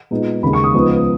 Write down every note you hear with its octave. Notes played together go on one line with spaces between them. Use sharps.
A#2 G#3 B3 D#4
D#2 C#3 G#3 B5
C#6
D#6
C#2 C#3 F3 B3 D#4